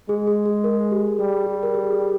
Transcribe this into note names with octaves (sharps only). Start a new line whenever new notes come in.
G#3 G#4
G#4
G#4
A#4
G4
G3 G#4
G4
A#4
G#4
G4